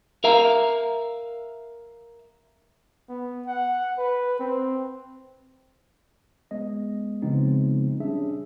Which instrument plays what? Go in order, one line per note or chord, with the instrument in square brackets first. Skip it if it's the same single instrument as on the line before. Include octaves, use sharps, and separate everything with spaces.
[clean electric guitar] A#4 E5 F5 A#5
[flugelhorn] B3
F#5
B4
C4
[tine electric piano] G#3 B3 D#5
C#3 F3 G#3 B3 C4 D#4
G3 C#4 D4 G#4 E5